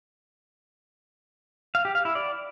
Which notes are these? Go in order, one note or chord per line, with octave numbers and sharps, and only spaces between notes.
F5
G4
F5
E4
D5